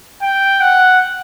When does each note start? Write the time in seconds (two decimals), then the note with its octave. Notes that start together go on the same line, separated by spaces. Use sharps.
0.22 G5
0.61 F#5